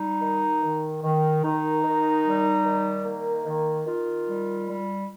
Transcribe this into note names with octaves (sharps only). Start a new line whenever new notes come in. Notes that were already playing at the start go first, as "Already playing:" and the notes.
Already playing: G3 D#4
D#3
D#3
D#3
D#3 D#4
D#3
G3
D#3
A#3
D#3
D#3 F4
G3
G3